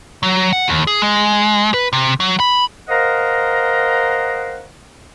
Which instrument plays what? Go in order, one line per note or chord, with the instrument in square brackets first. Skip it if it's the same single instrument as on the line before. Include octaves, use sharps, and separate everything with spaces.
[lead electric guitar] F#3
F#5
D#2
G#4
G#3
B4
C3
F#3
B5
[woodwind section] A#4 C5 D#5 F5 F#5 A#5